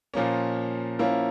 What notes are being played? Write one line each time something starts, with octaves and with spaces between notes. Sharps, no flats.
A#2 F3 A#3 C#4
F3 A#3 C#4 E4